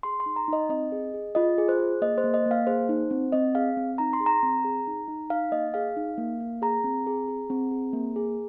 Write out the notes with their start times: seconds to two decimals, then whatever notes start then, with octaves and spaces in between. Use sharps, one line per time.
0.03 G#4 C6
0.20 C6
0.26 D#4
0.36 A#5
0.48 D#4 D#5
0.69 C4 D#5
0.92 G#4
1.14 G#4
1.35 F4 D#5
1.58 G#4
1.69 C5
1.79 G#4
2.02 A#3 D#5
2.18 C5
2.24 A#3
2.34 D#5
2.46 A#3
2.51 F5
2.67 G#4 C5
2.89 D#4
3.11 C4
3.32 C4 D#5
3.55 G#4 F5
3.77 C4
3.98 D#4 A#5
4.13 C6
4.20 G#4
4.26 A#5
4.43 C4
4.64 G#4
4.87 D#4
5.08 D#4
5.30 D#4 F5
5.52 A#3 D#5
5.74 G#4 F5
5.97 D#4
6.18 A#3
6.40 A#3
6.62 G#4 A#5
6.84 C4
7.07 G#4
7.28 G#4
7.50 C4
7.71 G#4
7.93 A#3
8.16 G#4